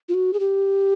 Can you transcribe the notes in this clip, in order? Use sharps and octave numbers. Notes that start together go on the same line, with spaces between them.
F4
F#4
G#4
G4